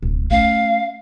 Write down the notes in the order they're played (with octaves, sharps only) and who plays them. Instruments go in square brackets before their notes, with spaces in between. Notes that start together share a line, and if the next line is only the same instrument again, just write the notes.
[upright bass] D1 B1
[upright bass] A3 C#4 [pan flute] F5